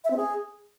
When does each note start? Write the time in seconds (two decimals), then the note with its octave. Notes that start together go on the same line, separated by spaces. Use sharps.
0.04 E5
0.10 C4
0.17 G#4